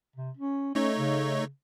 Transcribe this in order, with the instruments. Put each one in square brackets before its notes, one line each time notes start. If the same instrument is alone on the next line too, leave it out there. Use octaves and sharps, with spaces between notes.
[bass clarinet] C3
C#4
[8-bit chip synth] A3 D#4 C#5 [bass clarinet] C#4
[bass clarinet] C#3